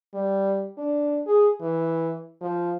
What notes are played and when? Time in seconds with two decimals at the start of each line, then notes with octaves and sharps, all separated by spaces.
0.14 G3
0.78 D4
1.27 G#4
1.61 E3
2.41 F3